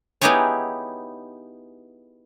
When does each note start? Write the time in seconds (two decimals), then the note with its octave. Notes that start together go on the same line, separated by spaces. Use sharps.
0.21 B3 D#4 E4 G4 G#4 C#5